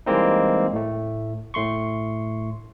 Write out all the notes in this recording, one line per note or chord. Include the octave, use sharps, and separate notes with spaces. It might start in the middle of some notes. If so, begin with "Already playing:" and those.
E3 G3 G#3 A#3 C4 D#4
A2 A3
A2 A3 C6 C#6